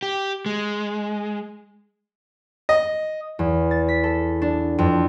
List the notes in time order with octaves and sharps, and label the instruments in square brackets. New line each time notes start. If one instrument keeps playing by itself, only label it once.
[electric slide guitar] G4
G#3
[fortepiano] D#5
[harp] E2
A6
B6
A4
D4
F2